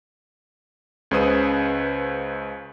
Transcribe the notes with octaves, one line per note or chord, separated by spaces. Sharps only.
C#2 C#3 B4 C5 D#6 D#7